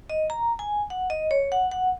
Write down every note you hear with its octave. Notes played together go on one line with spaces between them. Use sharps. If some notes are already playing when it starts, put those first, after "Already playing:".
D#5
A#5
G#5
F#5
D#5
C#5
F#5
F#5